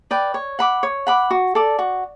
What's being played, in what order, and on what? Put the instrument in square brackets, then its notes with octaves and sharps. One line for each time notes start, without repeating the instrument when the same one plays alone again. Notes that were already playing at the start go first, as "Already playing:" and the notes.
[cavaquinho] B4 D5 G5
C#5
F#5 B5 D6
C#5
F#5 B5 D6
F#4
A4 D5
F#4